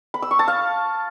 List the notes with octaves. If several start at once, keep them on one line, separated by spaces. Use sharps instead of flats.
B5
E6
C#6
A5
F5